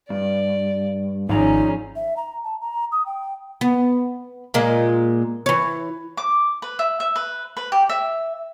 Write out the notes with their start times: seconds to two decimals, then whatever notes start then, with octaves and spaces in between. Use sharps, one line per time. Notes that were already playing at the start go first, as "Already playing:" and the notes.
0.10 G2 D5
1.29 G#1 F3 C#4 D#4 G#4 D5 A#5
1.96 E5
2.17 A#5
2.44 A5
2.61 A#5
2.92 D#6
3.06 G5
3.61 B3
4.54 A#2 G#3 A#3
5.46 E3 C#5
6.17 D6
6.62 B4
6.79 E5
7.00 E5
7.16 B4
7.57 B4
7.72 G4
7.89 E5